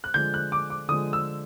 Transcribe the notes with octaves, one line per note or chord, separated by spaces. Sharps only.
F#6
D3 F3 G#3 G6
F#6
D6
D6
D3 F3 G#3 D#6
E6